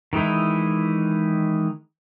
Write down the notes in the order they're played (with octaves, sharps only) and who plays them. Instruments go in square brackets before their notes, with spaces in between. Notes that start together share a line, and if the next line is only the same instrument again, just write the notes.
[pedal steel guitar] D#3 E3 G#3 D#4 E4